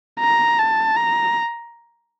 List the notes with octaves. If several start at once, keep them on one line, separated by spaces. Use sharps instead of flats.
A#5
A5
A#5